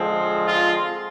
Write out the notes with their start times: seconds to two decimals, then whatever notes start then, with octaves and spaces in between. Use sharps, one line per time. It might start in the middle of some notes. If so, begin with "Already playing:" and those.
Already playing: D3 F3 G#3 C4
0.47 F4